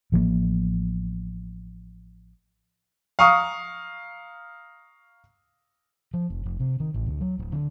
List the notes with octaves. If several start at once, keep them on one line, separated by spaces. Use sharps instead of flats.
A1 F3 G#3 A#3
F5 A#5 C#6 D#6 F6
F3
F1
F1
C3
D#3
A1
D2
F#3
D1
D3